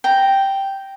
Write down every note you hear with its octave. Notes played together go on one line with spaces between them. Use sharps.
G5 A#5